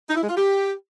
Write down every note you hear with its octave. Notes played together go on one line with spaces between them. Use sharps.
D#4
E4
G#3
F4
G4